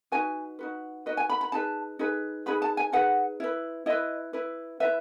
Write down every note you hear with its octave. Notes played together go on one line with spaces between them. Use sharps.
D#4 F#4 B4 G#5
D#4 F#4 B4
D#4 F#4 B4 D#5
G#5
B5
B5
D#4 G#4 B4 A5
D#4 G#4 B4
D#4 G#4 B4 B5
A5
G#5
D#4 G#4 B4 F#5
E4 B4
E4 B4 D#5
E4 B4
E4 B4 E5